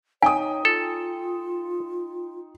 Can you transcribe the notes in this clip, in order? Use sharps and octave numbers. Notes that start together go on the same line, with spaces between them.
D#4 C#5 G5 G#5 D#6
F4 A4